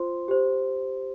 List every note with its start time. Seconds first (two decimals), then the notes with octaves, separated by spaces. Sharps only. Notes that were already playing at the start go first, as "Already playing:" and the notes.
Already playing: F4 C5 C6
0.28 G4 C5